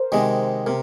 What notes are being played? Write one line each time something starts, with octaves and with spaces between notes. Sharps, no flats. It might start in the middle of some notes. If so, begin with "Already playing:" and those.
Already playing: A#4 C5
C3 D#3 G#3 D#5
C3 A#4